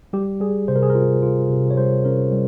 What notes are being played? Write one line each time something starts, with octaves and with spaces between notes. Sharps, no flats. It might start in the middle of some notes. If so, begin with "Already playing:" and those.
G3 G4
G3 G#4
C3 C5
A#4
G#4
A#4
F4
F4
C3
C#5
G3 C5
C#4 A#4
G3